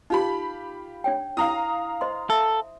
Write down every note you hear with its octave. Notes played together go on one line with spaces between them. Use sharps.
D#4 F4 G4 B5
D4 C#5 G5
E4 F5 A#5 D#6
C5 D#5 C6
A4 E5